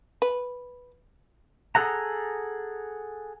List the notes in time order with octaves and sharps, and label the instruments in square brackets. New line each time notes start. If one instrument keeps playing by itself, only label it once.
[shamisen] B4
[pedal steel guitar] G#4 A4 F#5 A#5